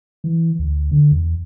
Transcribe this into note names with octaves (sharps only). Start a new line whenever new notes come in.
E3
D2
D3
E2